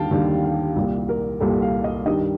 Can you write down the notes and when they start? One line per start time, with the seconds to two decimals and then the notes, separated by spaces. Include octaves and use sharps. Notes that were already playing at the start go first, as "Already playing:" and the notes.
Already playing: D#2 D3 G3 F5 G5 A5
0.11 D#2 D3 G3 G5
0.43 F5
0.76 C2 A#2 G3
1.09 A#4
1.40 C2 A#2 G3 A4
1.62 F5
1.84 D#5
2.05 G2 D#3 G3 D#5